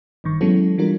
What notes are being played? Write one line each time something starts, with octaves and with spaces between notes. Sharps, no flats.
G#1 G2 D#3 C#6
F#3 G#3 B3 C#4 E4 A4
E3 G3 D4 F4 A#4